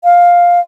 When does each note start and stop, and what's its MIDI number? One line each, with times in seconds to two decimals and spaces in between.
0.04 0.60 77